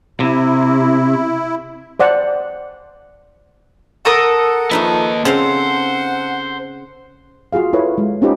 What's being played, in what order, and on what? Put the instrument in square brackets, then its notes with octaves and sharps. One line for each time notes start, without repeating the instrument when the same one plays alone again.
[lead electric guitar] C3 [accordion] E4
[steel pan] C5 D5 F#5
[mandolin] A4 A#4 D#6 [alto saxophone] F#5
[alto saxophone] F3 [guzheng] A3 D#4 B4 [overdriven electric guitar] A#3 D#5
[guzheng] C#3 C4 F5 [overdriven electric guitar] C5 [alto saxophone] F#5
[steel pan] F4 F#4 G#4 F5
E4 F4 A4 B4 C#5
G#3
C4 C#4 D#4 F4 G4 B4